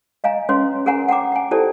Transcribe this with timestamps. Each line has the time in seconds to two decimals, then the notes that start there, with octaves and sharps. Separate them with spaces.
0.24 D#5 F5 G#5 A#5
0.49 C#4 B4 C#5 C6
0.86 G#4 A#4 C#5 F#5 G#5 A#5
1.08 F#5 G5 A#5 D6
1.32 G5 G#5
1.51 E4 G4 A4 C5 D5 A5